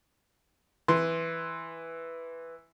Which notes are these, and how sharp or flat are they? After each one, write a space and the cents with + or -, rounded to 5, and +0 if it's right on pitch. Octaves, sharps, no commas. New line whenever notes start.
E3 +0 C6 +0